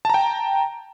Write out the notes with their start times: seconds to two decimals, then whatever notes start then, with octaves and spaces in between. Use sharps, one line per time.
0.05 A5
0.10 A#5
0.14 G5